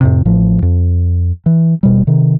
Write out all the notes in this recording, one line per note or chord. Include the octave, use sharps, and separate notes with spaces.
F2 A2 C3
A1 A2 F3
F2
E3
D#1 B2 G3
C3 D#3